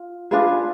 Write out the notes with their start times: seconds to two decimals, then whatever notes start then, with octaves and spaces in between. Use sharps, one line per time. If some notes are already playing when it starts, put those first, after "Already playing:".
Already playing: F4
0.31 D4 F4 G#4 B4